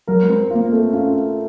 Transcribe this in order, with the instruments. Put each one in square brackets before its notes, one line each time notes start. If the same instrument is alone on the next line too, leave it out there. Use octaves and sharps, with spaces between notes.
[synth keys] F#3 [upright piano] A#4
[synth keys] G#3
[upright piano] C4
[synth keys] A#3 [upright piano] F4
[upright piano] A3 [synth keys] C4
[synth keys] C#4 [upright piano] F4